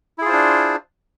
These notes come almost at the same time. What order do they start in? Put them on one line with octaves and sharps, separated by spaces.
E4 G#4 F4 C5 D4